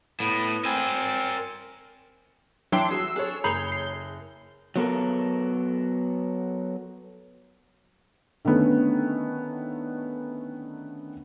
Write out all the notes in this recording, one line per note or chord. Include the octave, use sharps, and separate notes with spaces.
A2 B3
C4 A#4 G#5
E3 F#3 D4 E5 G5 C6 C7
F#4 G#4 C6 E6
D4 G#4 A4 C#5
F#1 G#4 C#5 A#5 B5 G6
C7
F#3 B3 A4 A#4
D3 D#3 A3 B3 C#4